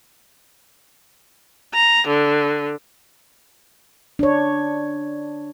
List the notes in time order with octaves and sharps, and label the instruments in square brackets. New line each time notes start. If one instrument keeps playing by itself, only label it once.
[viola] A#5
D3
[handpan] D4 C#5